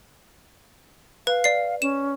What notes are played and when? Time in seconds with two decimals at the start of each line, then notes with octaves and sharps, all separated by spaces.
1.27 B4 F5
1.44 D5 C7
1.82 C#4 E7